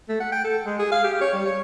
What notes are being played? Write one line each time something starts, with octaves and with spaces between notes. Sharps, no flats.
A3
F#5
G5
A4
G#3
G#4
F5
G4
C#5
G3
C#5